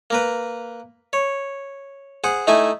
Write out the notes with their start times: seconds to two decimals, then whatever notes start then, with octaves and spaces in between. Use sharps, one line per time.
0.10 A#3 A#4 B4
1.13 C#5
2.24 G#4 C5 F#5
2.47 A3 D#4 E4 E5 G#5